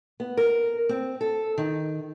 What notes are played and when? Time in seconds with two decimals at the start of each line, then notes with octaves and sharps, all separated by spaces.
0.20 B3
0.37 A#4
0.89 C4
1.21 A4
1.58 D#3